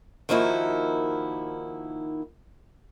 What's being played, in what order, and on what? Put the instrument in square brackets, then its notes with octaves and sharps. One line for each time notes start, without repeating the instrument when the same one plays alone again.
[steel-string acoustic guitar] D#3 F3 A#3 D#4 E4 F#4